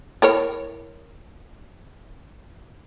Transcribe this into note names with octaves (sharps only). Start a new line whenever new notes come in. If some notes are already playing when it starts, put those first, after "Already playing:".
E4 A#4 C#5